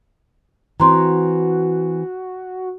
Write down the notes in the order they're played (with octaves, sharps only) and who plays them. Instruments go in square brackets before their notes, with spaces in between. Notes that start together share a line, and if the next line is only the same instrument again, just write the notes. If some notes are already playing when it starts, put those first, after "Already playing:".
[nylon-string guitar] E3 C4 [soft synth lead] F#4 [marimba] A#5 C6